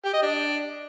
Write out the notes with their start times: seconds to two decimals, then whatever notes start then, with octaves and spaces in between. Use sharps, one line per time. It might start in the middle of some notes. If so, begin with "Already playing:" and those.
0.05 G4
0.13 D#5
0.22 D4